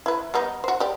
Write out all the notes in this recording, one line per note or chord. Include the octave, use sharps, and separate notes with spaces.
E4 B4
G3 B3 D#4
F#4 C5
G4 D5